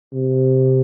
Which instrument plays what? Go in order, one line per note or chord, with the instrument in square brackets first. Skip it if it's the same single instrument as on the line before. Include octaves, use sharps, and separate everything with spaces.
[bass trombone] C3